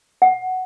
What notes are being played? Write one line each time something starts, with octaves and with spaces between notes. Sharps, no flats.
F#5